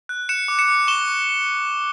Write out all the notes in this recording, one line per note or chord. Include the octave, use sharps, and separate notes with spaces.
F#6
F#6 C#7 E7
D6
C#7 E7
D6
C#6 E7 G7
C#6